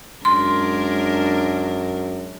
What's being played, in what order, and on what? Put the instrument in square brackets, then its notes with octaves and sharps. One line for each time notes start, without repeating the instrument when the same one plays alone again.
[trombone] F#2 [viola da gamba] G#3 D4 A#4 [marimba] C6